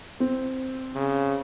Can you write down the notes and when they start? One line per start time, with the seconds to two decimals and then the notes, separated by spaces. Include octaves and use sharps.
0.20 C4
0.95 C#3